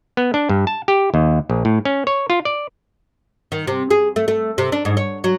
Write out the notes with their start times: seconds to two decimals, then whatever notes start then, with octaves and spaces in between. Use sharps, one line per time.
0.17 B3
0.34 D4
0.49 G2
0.67 A5
0.88 G4
1.14 D#2
1.50 A#1
1.65 A2
1.85 C#4
2.07 C#5
2.30 F4
2.45 D5
3.52 D#3
3.67 C3
3.91 G#4
4.16 A3
4.28 A3
4.58 C3
4.72 D4
4.85 G#2
4.97 C#5
5.24 F#3